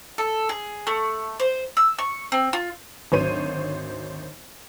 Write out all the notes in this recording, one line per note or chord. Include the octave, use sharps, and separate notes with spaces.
A4
G#4
A3
C5
E6
C#6
C4
F4
G#1 D2 F#3 C5 C#5 D#7